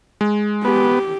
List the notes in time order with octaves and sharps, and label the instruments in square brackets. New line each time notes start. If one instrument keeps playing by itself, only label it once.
[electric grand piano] G#3
[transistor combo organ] B3 [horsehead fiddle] G4